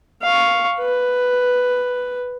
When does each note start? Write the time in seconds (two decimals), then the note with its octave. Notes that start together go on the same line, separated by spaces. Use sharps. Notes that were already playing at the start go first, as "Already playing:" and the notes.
0.23 F5 C#6
0.79 B4